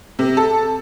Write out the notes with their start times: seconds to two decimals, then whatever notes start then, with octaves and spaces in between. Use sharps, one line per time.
0.19 C3
0.37 A4